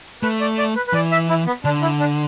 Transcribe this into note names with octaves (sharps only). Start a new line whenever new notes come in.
A3 B4
D5
D5
B4
B4
E3 D5
E5
E4
B3
D3 D4
E4
D4